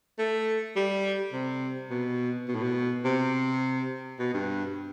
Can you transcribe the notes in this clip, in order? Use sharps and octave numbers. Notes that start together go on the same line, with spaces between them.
A3
G3
C3
B2
B2
A2
B2
C3
B2
G2